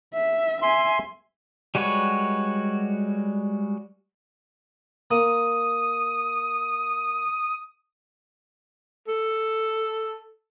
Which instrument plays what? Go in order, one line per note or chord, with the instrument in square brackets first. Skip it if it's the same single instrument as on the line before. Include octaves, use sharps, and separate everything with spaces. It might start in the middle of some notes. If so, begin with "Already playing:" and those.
[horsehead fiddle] E5
[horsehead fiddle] E5 G#5 [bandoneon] C6
[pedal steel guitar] G3 G#3 F#4 B4 C#5
[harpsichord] A#3 [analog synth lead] D#6
[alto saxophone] A4